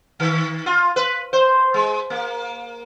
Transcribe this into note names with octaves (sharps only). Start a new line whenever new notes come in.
D#3
F4
B4
C5
G#3
A#3